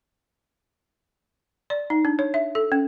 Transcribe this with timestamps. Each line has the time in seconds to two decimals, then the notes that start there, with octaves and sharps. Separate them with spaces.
1.70 D5
1.90 D#4
2.05 D4
2.19 C#5
2.34 E5
2.55 A4
2.72 C#4